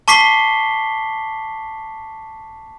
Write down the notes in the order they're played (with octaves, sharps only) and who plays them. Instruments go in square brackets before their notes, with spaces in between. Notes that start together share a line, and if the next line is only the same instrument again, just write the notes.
[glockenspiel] A5 C#6 D6 B6 C7 G7